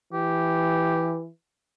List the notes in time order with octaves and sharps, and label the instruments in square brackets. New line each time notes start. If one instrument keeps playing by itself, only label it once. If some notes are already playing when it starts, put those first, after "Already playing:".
[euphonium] E3 [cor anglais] G4